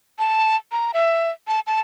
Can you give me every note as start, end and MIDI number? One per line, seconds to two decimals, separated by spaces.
0.19 0.56 81
0.72 0.91 82
0.94 1.30 76
1.48 1.60 81
1.67 1.80 81